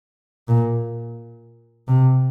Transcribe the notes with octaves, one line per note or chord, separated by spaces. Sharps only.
A#2
C3